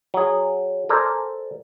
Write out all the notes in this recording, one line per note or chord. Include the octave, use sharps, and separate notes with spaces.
F#3 G#4
A4 A#4 C5 D5 G#5